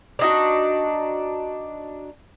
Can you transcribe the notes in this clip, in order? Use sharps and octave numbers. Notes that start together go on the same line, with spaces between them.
D4 D#4 F#4